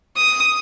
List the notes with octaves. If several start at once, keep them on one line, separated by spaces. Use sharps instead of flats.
D#6